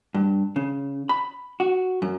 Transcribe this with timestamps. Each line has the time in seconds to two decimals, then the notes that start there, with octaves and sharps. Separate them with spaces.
0.14 G2
0.56 C#3
1.09 B5
1.60 F#4
2.02 F#2